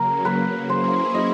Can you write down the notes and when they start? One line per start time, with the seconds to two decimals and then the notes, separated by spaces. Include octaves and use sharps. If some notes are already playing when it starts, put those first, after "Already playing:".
Already playing: C#3 F#3 A#3 A#4
0.25 B4
0.69 F#3 A#3 C#4 E4 G#4 C5
1.15 D#5